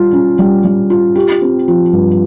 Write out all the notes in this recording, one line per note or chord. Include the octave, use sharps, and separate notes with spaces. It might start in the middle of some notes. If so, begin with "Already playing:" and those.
Already playing: G3 F4
C#4
G3
G3
F4
G4
C4
F3
G2